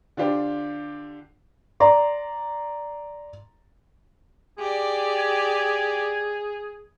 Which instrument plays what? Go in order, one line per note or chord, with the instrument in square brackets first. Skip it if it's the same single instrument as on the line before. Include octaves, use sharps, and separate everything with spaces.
[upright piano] D3 D4 F4 G4 C5
[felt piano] D5 A#5 C6
[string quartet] G4 D5 [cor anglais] G#4
[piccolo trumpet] G#6